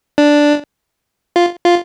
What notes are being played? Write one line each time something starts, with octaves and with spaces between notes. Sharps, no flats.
D4
F4
F4